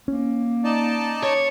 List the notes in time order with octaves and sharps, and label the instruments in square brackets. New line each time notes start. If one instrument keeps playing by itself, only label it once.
[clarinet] A#3 [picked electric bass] C#4
[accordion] D#4 D5 A5
[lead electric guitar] C#5